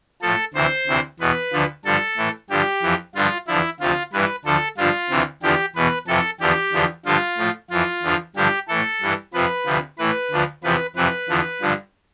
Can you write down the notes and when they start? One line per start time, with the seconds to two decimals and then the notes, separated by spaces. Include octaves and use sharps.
0.22 A2 F3 A4
0.54 D2 C3 E3 C5
0.87 D2 C3 E3
1.20 E2 B2 B4
1.53 D2 D3 F3
1.85 G2 D3 F3 A4
2.17 A2 E3
2.50 G2 D3 F3 G4
2.82 F2 E3
3.15 G2 D3 F3 F4
3.47 E2 D3 F3 E4
3.80 D2 C3 F3 F4
4.13 G2 E3 B4
4.45 D2 D3 F3 A4
4.77 G2 D3 F3 F4
5.10 D2 C3 E3
5.43 E2 D3 F3 G4
5.75 E2 B2 B4
6.07 F2 C3 E3 A4
6.40 E2 D3 F3 G4
6.73 E2 D3 F3
7.05 G2 D3 F3 F4
7.38 A2 F3
7.70 F2 E3 F4
8.03 E2 D3 F3
8.36 G2 D3 F3 G4
8.68 A2 E3 A4
9.01 G2 E3
9.33 F2 C3 F3 B4
9.66 D2 C3 F3
9.98 A2 E3 B4
10.31 D2 D3 F3
10.63 E2 C3 F3 B4
10.96 F2 C3 E3 B4
11.29 E2 D3 F3
11.61 G2 D3 F3